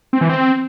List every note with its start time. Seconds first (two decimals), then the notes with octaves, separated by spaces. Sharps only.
0.13 C4
0.21 E3
0.29 C4